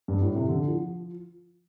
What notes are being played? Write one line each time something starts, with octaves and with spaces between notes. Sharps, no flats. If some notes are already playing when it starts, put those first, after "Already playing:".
G2
A2
C3
D3
F3